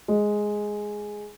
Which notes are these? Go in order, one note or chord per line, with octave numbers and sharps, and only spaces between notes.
G#3